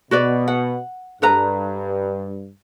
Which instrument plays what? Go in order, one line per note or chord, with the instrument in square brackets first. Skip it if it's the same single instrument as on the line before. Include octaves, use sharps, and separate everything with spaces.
[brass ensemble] B2 [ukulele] F#4 B4 D5
[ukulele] F#5
[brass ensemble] G2 [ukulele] A4 B4 A#5